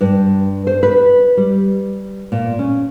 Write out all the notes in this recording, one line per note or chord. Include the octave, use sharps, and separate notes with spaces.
G2
C5
B4
G3
A#2
C#4